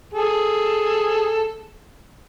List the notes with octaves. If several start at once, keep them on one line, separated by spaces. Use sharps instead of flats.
G#4 A4